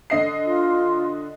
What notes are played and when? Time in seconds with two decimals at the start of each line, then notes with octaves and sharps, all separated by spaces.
0.10 D3 D#5 C7
0.46 F4